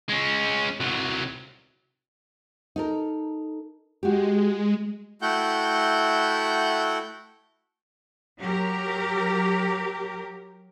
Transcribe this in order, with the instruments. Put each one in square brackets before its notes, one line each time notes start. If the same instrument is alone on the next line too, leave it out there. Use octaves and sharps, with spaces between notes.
[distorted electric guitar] G#3 C#4
C2 F#3
[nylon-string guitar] D#4 A4 A#4
[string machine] G#3 [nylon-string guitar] F#4 G4
[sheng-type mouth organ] A3 E4 F#4 F#5 G5 G6
[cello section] F#3 G4 A#4